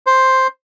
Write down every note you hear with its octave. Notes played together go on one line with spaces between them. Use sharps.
C5